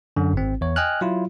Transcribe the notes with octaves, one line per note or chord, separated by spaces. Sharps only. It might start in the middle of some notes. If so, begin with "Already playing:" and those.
F#2 D3
G#1 C4
E2 C#5
D#5 G5 G#5 F6 F#6
F#3 E4 F4